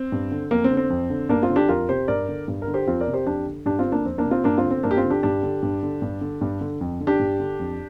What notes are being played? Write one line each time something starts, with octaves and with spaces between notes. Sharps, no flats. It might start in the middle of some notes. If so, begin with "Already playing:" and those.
Already playing: C4
G2
D3
F2 A#3
C4
D3
C4
F2
D3
G2 A#3 D4
C4 F4
D3
D4 G4
F2 F4 A#4
C3 G4 C5
G2 A#4 D5
D3
G2
A#4
D3
G4 C5
F2 C4 F4
A#4 D5
C3
G4 C5
F2 D4 G4
D3
G2 D4 G4
C4 F4
D3
A#3 D4
F2 C4
A#3 D4
C3
C4 F4
G2 A#3 D4
C4 F4
D3
C4
G2 A#3 D4
G4
C4 F4
D3
D4 G4
G2 D4 G4
D3
G2
D3
G2
D3
G2
D3
F2
D3
D4 G4
G2
D3
F2